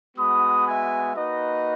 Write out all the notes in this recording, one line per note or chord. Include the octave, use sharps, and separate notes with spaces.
G#3 B3 F#4 B5 D#6
E5 G#5
A#3 D#4 F#4 B4 D#5